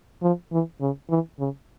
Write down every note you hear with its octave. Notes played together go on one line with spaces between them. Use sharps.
F3
E3
C#3
E3
C#3